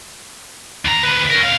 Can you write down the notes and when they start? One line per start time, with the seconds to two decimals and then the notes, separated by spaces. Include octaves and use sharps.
0.85 D#2 A#5
1.03 D2 B4
1.30 C#4 A#4
1.42 B2 F5